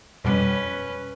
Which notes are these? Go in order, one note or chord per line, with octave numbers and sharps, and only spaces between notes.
F2 B2 G3 C#4 B4